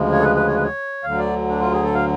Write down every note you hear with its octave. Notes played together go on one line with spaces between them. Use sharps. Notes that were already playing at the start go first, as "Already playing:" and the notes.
Already playing: D2 C#3 F3 G#3
C#5
A4
B4
B4
C#5
B4
C#5
D2 D3 F#3 F5
D5
D4
F4
G#4
A4
F5